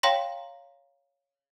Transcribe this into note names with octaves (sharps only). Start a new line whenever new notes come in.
C#5 F5 G5 A#5 C6 A#6